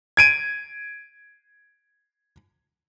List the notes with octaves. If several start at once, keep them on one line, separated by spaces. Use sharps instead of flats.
G#6 D7 D#7